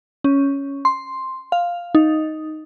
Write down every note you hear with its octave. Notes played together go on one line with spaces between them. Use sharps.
C#4
C6
F5
D#4